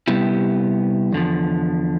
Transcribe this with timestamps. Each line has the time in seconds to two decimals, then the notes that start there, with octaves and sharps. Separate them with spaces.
0.08 C3 G3 B3 E4 G4
1.12 E2 D3 F3